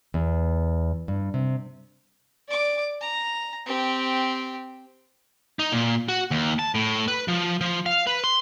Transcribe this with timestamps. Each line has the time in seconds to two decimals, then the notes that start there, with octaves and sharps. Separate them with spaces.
0.14 E2
1.08 G2
1.34 C3
2.48 D5 D6
3.01 A#5
3.66 C4 G4
5.59 D#4
5.72 A#2
6.08 F#4
6.31 D#2
6.59 A5
6.75 A2
7.08 B4
7.28 F3
7.61 F3
7.86 F5
8.07 B4
8.24 C6